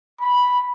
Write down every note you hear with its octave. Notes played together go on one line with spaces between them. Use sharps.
B5